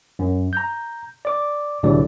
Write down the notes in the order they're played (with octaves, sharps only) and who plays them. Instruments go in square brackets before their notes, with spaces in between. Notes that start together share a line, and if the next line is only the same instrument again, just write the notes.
[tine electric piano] F#2
A#5 G6
D5 D6
C2 A2 D3 F#3 G3 D5